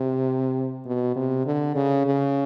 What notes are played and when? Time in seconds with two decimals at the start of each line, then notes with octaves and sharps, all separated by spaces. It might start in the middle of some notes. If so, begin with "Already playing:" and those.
Already playing: C3
0.86 B2
1.16 C3
1.46 D3
1.76 C#3
2.06 C#3